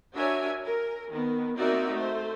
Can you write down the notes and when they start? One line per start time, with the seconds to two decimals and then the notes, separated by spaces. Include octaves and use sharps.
0.15 D4 F#4 A#4 C#5 E5 G#5
0.64 A#4
1.12 D#3 B3
1.58 A#3 C4 D#4 F#4 D5 E5
1.94 A3 C5